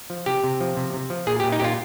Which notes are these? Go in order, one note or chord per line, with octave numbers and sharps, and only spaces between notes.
F3
C3 G4
C3
F3
C3
C3
F3
A#2 G#4
G4
A#2
D#4
A#2 F4 G4